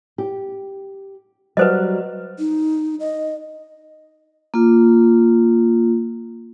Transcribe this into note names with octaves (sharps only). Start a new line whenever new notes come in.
G4
F#3 G3 B4 C5 D#5
D#4
D#5
A#3 F4